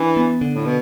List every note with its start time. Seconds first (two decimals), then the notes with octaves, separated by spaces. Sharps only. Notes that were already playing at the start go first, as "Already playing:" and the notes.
Already playing: E3 D4
0.17 B3
0.41 D3
0.55 A2
0.66 B2